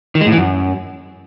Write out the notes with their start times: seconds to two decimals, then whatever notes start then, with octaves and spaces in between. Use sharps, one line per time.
0.15 D#3
0.21 G#3
0.26 A2
0.32 E3
0.38 F#2